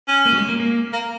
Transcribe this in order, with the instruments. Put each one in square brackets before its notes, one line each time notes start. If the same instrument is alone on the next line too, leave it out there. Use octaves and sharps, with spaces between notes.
[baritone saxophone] C#4
[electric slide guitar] A#3
F#3
G#3
A#3
A#3
[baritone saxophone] A#3